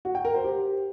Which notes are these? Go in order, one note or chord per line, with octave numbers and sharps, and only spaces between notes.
F#4
G5
A#4
C5
G4